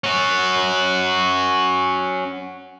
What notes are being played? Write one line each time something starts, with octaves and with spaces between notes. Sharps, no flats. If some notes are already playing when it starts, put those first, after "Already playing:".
C#4 F#4